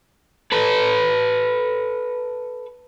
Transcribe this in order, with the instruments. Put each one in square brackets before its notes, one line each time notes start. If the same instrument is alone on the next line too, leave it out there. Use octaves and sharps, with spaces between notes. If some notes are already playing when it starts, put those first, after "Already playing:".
[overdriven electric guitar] A4 B4